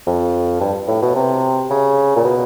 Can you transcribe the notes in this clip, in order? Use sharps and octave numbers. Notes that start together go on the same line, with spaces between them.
F2
G2
A2
B2
C3
C#3
A#2
B2